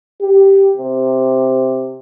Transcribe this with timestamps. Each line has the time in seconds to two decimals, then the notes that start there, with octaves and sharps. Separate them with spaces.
0.22 G4
0.77 C3